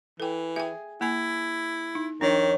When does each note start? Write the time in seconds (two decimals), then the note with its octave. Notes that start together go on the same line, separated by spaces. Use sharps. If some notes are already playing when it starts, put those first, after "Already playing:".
0.20 E3 A4 G5
0.56 G#4 E5 G5
1.01 A#3 E4 G#5
1.95 D#4
2.21 F2 D#3 D4 C#5